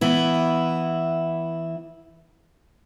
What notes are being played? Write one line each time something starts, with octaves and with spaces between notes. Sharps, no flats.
E3 B3 E4